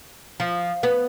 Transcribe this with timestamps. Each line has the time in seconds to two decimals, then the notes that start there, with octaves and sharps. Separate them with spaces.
0.40 F3
0.83 B3